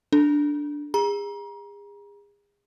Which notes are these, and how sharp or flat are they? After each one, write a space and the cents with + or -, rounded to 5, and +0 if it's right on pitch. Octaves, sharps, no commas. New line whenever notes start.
D4 +0 A4 +0
G#4 -35 A#5 +35